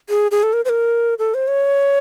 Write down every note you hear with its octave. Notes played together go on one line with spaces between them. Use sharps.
G#4
G#4
A4
A#4
C5
A#4
A4
C5
C#5